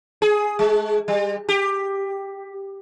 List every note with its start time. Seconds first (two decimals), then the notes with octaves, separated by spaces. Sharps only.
0.22 G#4
0.59 G#3
1.08 G3
1.49 G4